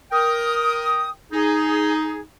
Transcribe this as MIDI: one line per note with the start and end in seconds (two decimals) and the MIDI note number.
0.12 1.09 70
0.12 1.09 79
0.12 1.09 87
1.32 2.20 63
1.32 2.20 68